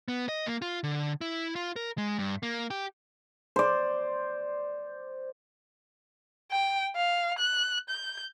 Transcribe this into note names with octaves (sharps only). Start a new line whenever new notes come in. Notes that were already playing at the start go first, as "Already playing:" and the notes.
B3
D#5
A#3
F4
D3
E4
F4
A#4
G#3
G2
A#3
G4
C5 D5
G5
F5
F#6
G6